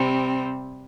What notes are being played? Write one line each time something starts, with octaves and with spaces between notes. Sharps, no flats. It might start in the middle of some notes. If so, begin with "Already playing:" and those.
Already playing: C3 G3 C4